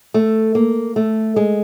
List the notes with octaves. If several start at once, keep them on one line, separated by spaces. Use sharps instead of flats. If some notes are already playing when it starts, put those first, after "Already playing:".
A3
A#3
A3
G#3